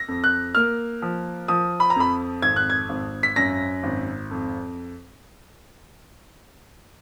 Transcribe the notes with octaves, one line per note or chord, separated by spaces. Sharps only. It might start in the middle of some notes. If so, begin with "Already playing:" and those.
Already playing: A#6
F2
F#6
A#3 F6
F3
F3 D#6
B5
A#5
F2 B5
G#1 G#6
F#6
G#6
G#1
B6
F#2 A#6
G#1
F2